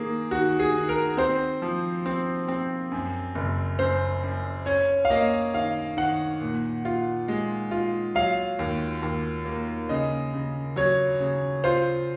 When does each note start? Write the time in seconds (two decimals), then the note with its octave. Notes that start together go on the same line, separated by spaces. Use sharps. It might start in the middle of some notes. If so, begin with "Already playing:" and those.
Already playing: D#3 A#3 G#4
0.31 D#3 F#4
0.59 G#4
0.74 D#3
0.89 A#4
1.17 C4 C5
1.62 F3
2.06 C4
2.48 C4
2.92 F#2
3.35 F#1
3.79 F#2 C5
4.24 F#2
4.66 C#4 C#5
5.05 F5
5.10 A#3 D#5
5.54 D#3 F5
5.97 D#3 F#5
6.41 A#2
6.85 F4
7.28 G#3
7.71 F4
8.15 F#3 F5
8.59 D#2
9.03 D#2
9.45 A#3
9.89 C#3 D#5
10.34 C#3
10.76 F#3 C#5
11.20 C#3
11.64 F4 C5